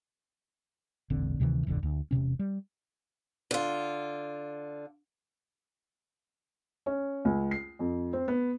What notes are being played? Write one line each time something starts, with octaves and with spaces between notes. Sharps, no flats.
E1 A#1 D3 C4
D2 C3 D#3 E3
D#1 A1 F2 D3
D2
E1 C#2 C3 C#4
G3
D3 F4
C#4
C#2
C7
F2
C4
B3